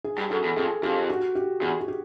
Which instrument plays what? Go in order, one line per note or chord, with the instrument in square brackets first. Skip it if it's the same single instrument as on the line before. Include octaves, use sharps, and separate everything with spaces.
[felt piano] G#4
[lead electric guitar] G2
[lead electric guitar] F#2 [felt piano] A4
[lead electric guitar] E2
[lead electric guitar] F2 [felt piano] G#4
[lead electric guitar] F2 [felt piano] G4
[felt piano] F#4
G4
[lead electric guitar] E2 [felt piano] G#4
[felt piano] G#4
G4